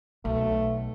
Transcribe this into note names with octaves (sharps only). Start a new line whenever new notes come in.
B1 A3